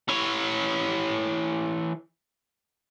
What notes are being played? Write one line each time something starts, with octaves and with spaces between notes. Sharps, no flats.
E3 C#5